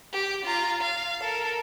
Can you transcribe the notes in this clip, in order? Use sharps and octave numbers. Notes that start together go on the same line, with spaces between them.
G4
F4 A#5
F5
A4 A#4